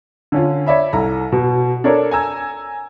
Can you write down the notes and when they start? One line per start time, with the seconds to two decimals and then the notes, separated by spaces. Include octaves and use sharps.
0.32 D3 C#4 F4
0.66 C#5 D5 E5 B5
0.93 C2 A4 A#5
1.32 B2
1.84 D4 A4 A#4 C#5 D5
2.11 G#5 A#5 E6 G#6